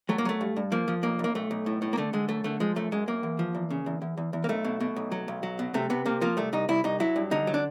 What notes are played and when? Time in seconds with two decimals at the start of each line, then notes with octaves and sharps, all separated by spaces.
0.09 F#3 A3
0.18 A#3
0.25 F#3 A3
0.41 G2
0.56 G2
0.72 F3 A#3
0.88 F3
1.03 B1 A#3
1.19 B1
1.24 A#3
1.35 B1 A3
1.51 B1
1.66 A2
1.82 A2
1.93 A#3
1.97 D3 A3
2.13 D3 G#3
2.29 F#2 A3
2.44 D3 A3
2.60 F3 G#3
2.76 F#2 A3
2.92 F#2 G#3
3.08 F#2 A#3
3.23 E2
3.39 F3
3.55 E2
3.70 C#3
3.86 E2
4.02 E2
4.17 E2
4.33 E2
4.44 A#3
4.49 B1 A3
4.64 B2
4.80 B2
4.96 B1
5.12 F#3
5.28 B1
5.43 F#3
5.59 B2
5.74 C3 A3
5.90 C3 B3
6.06 C3 A#3
6.21 F3 A#3
6.37 C2 A3
6.53 C2 D#4
6.69 C2 E4
6.84 C2 D#4
7.00 F#3 E4
7.16 G2
7.31 D3 D#4
7.47 F#3
7.54 D4